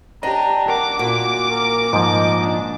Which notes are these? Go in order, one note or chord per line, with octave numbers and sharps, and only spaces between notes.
D4 G4 D#5 A#5
A#4 F#5 D6
A#2 F#4
A#4
G#2 F3 D#5
D4